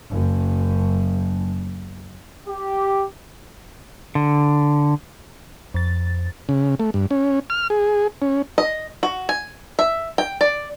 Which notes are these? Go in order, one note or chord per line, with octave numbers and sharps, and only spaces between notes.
F#1 F#2
G4
D3
F2 A6
C#3
A3
G2
C#4
F6
G#4
C#4
D#5
F#4
G#5
E5
G5
D5